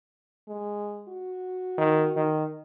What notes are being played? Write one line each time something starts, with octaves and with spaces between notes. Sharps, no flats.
G#3
F#4
D#3
D#3